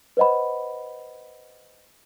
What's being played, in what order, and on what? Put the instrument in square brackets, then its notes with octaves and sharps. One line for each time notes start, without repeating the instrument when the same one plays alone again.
[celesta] B4 C5 D#5 F#5 B5